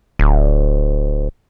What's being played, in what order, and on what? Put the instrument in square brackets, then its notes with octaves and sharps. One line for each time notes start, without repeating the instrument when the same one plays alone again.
[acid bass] D1